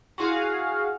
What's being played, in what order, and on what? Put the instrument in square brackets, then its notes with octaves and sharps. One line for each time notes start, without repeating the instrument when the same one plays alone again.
[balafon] E4 C6 C#6 [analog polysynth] F#4 G#4 F5